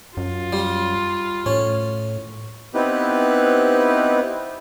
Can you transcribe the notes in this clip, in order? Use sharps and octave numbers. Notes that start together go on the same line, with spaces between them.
F#2 F4
G3
A2 C#4
B3 C4 D#4 E4 G4 B4